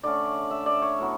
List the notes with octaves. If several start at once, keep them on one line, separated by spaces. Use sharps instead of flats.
D3 A3 C#4 D5
E5
D5
C#5
A2 F#3 B3